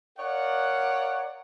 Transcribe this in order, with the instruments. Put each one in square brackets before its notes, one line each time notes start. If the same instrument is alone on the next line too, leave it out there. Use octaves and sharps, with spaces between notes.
[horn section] A#4 C#5 D5 F5 F#5